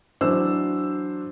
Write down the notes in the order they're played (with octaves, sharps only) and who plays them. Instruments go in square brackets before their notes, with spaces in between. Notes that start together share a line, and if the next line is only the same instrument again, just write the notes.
[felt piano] E3 F#3 D4 C5 E6